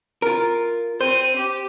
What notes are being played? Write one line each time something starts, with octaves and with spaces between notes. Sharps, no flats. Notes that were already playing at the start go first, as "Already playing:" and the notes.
F4 A#4
C4 C5 D#7
G4